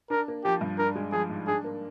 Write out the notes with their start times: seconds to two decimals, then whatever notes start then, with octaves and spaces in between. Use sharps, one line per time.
0.10 D4 A#4
0.28 A#3
0.44 F3 G4
0.61 G2
0.78 D4 A#4
0.96 G#3
1.12 F3 G#4
1.30 G#2
1.47 D4 G#4
1.64 A#3